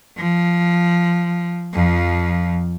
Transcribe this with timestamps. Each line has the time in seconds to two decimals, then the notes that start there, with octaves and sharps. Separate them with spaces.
0.17 F3
1.73 F2 F3